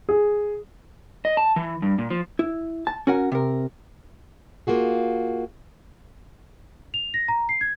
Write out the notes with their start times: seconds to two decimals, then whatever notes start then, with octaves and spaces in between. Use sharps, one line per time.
0.09 G#4
1.25 D#5
1.37 A5
1.56 E3
1.82 G2
1.98 A#2
2.10 F3
2.39 E4
2.87 A5
3.07 C#4 F#4 A#4 F#5
3.32 C3 A#4
4.67 A#3 F4 F#4 G#4
6.94 F7
7.14 A#6
7.28 A#5
7.49 C7
7.61 G#6